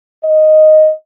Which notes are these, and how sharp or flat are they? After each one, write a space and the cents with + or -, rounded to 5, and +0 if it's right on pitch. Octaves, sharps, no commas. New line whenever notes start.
D#5 +0